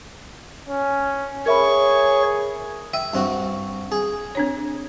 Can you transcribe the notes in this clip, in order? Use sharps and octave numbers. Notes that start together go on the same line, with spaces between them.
C#4
G#4 A#4 C#5 E5 B5 C#6
E5 G5
G2 C4 F#4
G#4
C4 D4 C#5